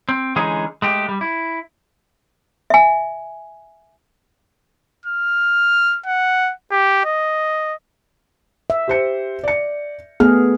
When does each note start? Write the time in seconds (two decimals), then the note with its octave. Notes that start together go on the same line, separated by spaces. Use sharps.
0.09 C4
0.36 D3 E3 G#3 C#4 D#4 G#4
0.82 G#3 A3 G4
1.09 G3
1.21 E4
2.70 E5 G#5
5.06 F6
6.06 F#5
6.71 G4
7.05 D#5
8.70 E5
8.88 G4 C5 C#7
9.43 D5 C#7
10.20 A3 B3 G#4 F6